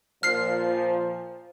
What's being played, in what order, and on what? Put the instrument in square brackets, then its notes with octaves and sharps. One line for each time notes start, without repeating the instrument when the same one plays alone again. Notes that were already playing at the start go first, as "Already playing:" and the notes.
[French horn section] A#2 F3 [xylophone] F6 C7